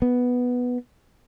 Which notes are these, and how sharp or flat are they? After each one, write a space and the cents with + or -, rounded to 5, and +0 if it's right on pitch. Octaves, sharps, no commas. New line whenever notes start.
B3 +0